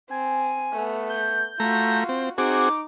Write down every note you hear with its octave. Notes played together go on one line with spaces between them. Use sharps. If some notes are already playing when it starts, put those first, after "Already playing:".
C4 G#5
A3 B3
G6
A3 F4 F#4 A#5
C4
C4 D#4 F#4 G#4 D6